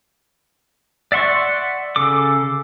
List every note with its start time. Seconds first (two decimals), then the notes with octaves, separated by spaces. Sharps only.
1.12 D5 E5 F#5 C6 C#6
1.96 C#3 A4 D6